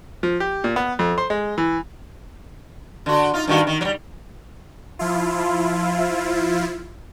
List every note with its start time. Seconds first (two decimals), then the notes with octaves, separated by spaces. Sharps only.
0.23 F3
0.40 G4
0.64 A#2
0.76 B3
0.99 F2
1.18 C5
1.30 G#3
1.58 E3
3.06 D3 F#4
3.34 D#4 F4
3.47 G2 D#3 F#4
3.67 D#3
3.81 F#3 G3
4.99 F3 E4 F4